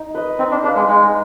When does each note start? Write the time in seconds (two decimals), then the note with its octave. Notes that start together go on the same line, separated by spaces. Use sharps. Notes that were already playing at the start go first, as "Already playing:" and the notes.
Already playing: D#4
0.14 B4 D#5
0.39 C4 D#4
0.51 D4
0.64 D4 B4
0.68 F5
0.76 G#3
0.88 G#3 D#4